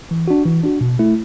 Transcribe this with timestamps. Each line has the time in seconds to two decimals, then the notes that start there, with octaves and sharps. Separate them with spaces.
0.11 E3
0.28 D4 F#4
0.45 E3
0.64 D4 F#4
0.81 B2
0.99 A3 E4